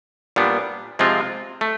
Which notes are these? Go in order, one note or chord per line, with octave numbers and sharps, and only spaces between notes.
A#2 G3 B3 D4
C3 F3 G#3 C4 F4
A3